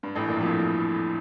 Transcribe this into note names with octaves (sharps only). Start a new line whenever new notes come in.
G2
A1 A2
A#1 A#2
F2 F3